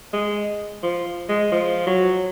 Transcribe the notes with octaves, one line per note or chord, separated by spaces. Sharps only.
G#3
F3
G#3
F3
F#3